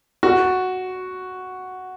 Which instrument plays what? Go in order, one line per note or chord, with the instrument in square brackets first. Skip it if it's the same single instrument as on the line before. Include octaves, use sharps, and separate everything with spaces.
[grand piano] F#4